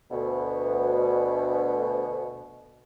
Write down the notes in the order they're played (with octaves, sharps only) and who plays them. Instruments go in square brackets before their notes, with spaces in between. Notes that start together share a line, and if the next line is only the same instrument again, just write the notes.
[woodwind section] D2 B2